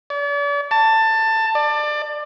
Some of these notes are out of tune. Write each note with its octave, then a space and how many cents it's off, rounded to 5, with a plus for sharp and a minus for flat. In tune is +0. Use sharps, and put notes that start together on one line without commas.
D5 -40
A5 +15
D5 +25